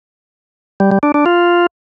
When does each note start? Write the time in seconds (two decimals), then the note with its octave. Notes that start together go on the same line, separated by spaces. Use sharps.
0.80 G3
0.91 G3
1.03 D4
1.14 D4
1.26 F4